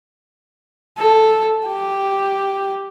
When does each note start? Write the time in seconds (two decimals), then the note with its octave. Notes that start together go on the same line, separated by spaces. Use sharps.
0.99 A4
1.67 G4